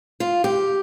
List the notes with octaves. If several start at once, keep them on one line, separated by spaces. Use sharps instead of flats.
F4
G4